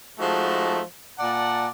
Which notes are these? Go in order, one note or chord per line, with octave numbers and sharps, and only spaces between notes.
F3 G#3 A3 D#4 F#4
A#2 D5 F#5 A5